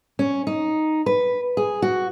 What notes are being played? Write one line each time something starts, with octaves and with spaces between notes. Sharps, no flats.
C#4
D#4
B4
G#4
F#4